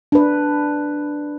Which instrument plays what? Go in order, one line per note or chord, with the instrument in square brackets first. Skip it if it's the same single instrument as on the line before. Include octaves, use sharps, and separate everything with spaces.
[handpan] D4 B4